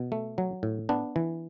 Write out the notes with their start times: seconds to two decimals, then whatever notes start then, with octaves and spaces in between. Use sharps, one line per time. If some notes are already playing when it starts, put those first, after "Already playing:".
Already playing: B2
0.12 A3
0.38 F#3
0.63 A2
0.89 B3 D4
1.16 E3